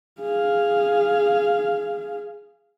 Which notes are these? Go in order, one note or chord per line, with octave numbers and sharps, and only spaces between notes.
G#4 F5